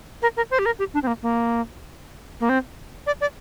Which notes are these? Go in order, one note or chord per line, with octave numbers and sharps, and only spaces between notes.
A#4
A#4
C5
G4
A#4
G4
D4
C4
A#3
A#3
A#3
C4
D5
D5